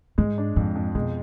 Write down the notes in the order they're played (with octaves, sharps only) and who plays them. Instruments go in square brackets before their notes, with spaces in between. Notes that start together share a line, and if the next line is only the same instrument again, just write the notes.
[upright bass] G#2 [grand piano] G#3
[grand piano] D4
[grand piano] F2 [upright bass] G#2
[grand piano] F2
[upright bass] B2 [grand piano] G#3